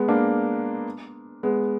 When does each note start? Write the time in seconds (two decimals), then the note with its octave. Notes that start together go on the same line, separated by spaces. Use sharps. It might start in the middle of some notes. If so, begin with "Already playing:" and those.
Already playing: G#3 B3
0.08 A#3 D4
1.43 G#3 B3